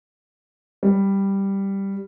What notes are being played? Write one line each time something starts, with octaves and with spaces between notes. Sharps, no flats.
G3